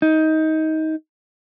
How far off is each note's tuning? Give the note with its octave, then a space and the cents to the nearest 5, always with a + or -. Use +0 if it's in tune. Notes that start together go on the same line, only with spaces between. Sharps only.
D#4 +20